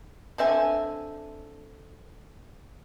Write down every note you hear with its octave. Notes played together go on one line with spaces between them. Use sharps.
D3 C4 E5 G#5